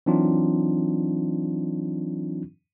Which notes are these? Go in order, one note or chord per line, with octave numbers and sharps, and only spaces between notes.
E3 F#3 C4 D4 D#4 F4